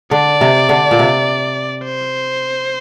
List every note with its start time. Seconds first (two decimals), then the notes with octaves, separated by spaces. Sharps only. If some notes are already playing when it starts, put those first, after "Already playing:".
0.11 D3 D5
0.41 C3
0.69 D3
0.91 A#2
0.99 C3
1.86 C5